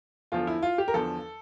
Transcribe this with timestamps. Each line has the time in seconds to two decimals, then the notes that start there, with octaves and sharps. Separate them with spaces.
0.32 E2 D3 F3 F4
0.47 E4
0.62 F4
0.78 G4
0.88 A#4
0.94 E2 D3 F3 A4